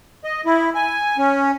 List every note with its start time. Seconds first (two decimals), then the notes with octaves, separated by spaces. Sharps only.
0.24 D#5
0.45 E4
0.75 G#5
1.18 C#4